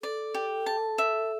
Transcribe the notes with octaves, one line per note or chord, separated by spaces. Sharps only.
A4 D5
G4
A5
E5